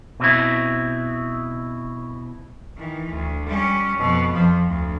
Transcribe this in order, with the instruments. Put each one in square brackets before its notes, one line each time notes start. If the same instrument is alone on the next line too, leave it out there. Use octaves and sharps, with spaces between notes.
[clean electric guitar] B2 C4 E4
[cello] D#3 E3
D2
G3 C#4
F2 B2
F2 F3
D2